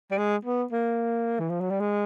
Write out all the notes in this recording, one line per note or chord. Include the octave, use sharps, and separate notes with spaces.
G3
G#3
B3
A#3
E3
F3
F#3
G3
G#3